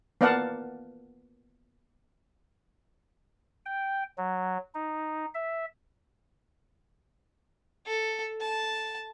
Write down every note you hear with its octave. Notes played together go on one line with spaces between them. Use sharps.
A#3 B3 D5 F5 F#5 A5
G5
F#3
D#4
E5
A4
A5